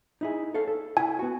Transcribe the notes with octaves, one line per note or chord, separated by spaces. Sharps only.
D#4 E4 G#4
A4 C#5 F5
A4
E4 G#5
B3 F#4